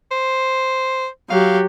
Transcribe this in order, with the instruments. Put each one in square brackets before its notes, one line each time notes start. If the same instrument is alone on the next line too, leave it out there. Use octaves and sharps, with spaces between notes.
[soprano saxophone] C5
[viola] F#3 G4 [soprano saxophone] F5